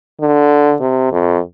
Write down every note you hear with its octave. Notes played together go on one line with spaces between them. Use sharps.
D3
C3
F2